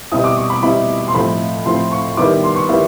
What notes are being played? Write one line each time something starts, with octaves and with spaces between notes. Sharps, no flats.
B2 G3 C4 E4 D#6
D6
C#6
B5
B2 G3 C4 E4 B5
C6
A2 F3 A3 C4 B5
A2 F3 A3 C4 C6
C#6
D#3 G3 B3 E4 D6
C6
C#6
D#3 G3 B3 E4